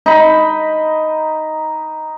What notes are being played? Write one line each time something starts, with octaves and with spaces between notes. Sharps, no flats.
D#4 B5